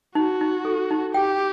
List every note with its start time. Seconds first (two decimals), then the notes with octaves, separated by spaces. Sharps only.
0.15 D#4 F#4
0.41 D#4
0.65 A4
0.90 D#4
1.14 G4 G5